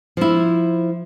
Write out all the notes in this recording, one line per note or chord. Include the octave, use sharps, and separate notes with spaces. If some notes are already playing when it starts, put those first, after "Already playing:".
F3 E4